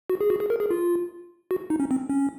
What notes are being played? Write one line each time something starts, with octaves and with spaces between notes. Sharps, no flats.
F#4
G#4
F#4
G#4
A#4
G#4
F4
F#4
D#4
C#4
C4
C#4